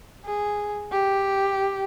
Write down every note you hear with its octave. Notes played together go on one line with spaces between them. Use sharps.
G#4
G4